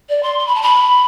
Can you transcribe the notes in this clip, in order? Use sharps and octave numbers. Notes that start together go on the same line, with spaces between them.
D5
C6
C6
B5
A5
B5